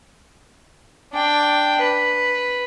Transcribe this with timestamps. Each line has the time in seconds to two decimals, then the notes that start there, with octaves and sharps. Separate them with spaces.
1.13 D4 G5
1.81 B4